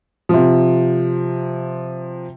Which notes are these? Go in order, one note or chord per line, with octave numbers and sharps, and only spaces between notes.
C3 F3